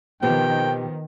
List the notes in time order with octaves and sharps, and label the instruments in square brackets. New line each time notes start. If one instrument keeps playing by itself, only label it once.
[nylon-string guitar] B2 C4 G4 [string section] D#3 [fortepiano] F3 B3 [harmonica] G5